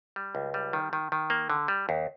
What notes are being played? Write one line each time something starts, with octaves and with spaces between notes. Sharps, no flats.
G3
C#2
G3
D#3
D#3
D#3
A#3
D3
G3
D#2